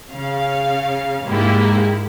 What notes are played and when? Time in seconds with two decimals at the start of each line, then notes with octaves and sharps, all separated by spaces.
0.11 C#3 F5
1.24 G#2 G#3 A#3 E4 G4